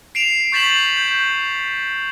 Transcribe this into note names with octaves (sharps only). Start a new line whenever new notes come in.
C7 D7 E7 F7
C#6 G6 A6 B6 E7 F#7
G6